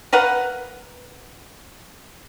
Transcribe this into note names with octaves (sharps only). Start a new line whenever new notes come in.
A#4 B4 F5 F#5